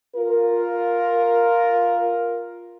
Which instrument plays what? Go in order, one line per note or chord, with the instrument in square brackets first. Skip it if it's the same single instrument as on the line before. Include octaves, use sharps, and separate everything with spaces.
[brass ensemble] F4 A#4